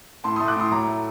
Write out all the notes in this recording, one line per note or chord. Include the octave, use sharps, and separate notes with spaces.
A2 A5 C6
A3 C6 D#6
D6 F#6
A2 C6 D#6
F#3 A#5 D6
A3